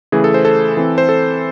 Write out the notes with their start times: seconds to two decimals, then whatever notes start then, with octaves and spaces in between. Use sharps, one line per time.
0.12 C#3 E3 A3 G#4
0.24 A4
0.34 C5
0.45 A4
0.77 E3 C4
0.98 C5
1.09 A4